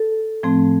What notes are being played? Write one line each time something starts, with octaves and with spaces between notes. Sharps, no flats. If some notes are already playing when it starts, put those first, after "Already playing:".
Already playing: A4
A2 F3 A3 C4